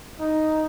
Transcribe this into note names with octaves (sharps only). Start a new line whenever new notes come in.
D#4